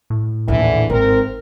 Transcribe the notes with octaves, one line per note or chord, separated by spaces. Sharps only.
A2
A#1 D#2 D3 E3
G#1 C4 A#4